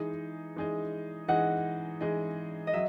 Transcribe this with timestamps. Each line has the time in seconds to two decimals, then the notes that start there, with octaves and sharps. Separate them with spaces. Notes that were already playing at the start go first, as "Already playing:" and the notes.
Already playing: E3 G#3 D#4 G#4 D#5
0.56 E3 G#3 D#4 G#4 D#5
1.28 E3 G#3 D#4 G#4 D#5 F#5
2.01 E3 G#3 D#4 G#4 D#5
2.67 D#5
2.73 F#3 E5